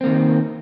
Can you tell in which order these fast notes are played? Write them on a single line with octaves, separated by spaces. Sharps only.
C4 A#3 D#3